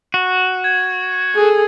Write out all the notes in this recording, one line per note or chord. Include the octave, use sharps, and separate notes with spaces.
F#4
G#6
G#4 A4